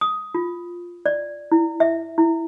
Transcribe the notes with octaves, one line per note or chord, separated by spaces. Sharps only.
D#6
F4
D5
E4
E5
E4